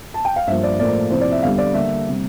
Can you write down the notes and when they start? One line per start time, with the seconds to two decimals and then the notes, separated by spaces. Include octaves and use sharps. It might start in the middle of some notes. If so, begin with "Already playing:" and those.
0.14 A5
0.25 G5
0.36 F5
0.47 G2 F3 A#3 E5
0.63 D5
0.79 A2 F3 A#3 D5
1.10 C3 F3 C4 E4 C5
1.21 D5
1.32 E5
1.43 E2 D3 G3 F5
1.58 D5
1.74 D3 G3 A#3 D4 E5
2.08 C3 G3